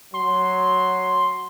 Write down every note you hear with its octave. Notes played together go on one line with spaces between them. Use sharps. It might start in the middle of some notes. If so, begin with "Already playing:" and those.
F#3 C6